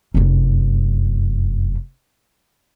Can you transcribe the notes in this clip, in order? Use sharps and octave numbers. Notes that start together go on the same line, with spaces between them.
F1 F#2